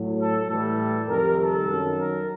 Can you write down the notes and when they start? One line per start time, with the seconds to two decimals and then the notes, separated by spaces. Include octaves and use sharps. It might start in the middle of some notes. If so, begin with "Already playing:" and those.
Already playing: A2 F#3
0.19 A4
0.49 A2 E3 G3 A4
1.08 F2 C3 D#3 G3 A#4
1.38 A4
1.68 F#2 D#3 F#3
1.99 A#4